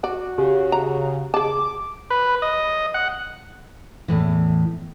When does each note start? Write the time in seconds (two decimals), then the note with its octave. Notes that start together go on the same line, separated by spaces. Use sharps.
0.04 F#4 D5
0.38 C#3 G4
0.72 A#5
1.34 G#4 A5 D6
2.10 B4
2.42 D#5
2.94 F#5
4.08 E2 A2 E3